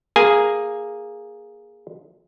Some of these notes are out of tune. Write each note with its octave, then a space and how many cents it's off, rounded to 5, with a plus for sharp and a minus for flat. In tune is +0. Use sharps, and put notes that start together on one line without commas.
A#3 +0 G#4 +0 G#5 +0